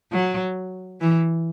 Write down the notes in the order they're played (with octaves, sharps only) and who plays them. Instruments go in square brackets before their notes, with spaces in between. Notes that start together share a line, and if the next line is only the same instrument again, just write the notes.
[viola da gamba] F#3
E3